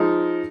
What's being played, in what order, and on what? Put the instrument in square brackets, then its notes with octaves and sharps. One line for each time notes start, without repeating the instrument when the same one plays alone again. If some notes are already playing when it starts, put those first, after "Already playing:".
Already playing: [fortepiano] F3 G#3 D#4